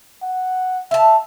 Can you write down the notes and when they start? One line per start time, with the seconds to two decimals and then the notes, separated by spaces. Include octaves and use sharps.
0.23 F#5
0.91 E5 F5 A5